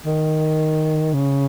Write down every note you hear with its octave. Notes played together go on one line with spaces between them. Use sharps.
D#3
C#3